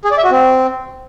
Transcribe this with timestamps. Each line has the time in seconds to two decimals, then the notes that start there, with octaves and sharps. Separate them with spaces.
0.05 G#4
0.11 D5
0.18 E5
0.24 F#4
0.31 C4